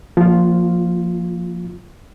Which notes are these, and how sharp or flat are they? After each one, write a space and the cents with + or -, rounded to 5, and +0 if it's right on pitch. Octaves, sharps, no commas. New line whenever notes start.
F3 +0 A#3 +0 F4 +0